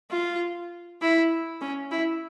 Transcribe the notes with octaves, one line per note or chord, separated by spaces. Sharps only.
F4
E4
C#4
E4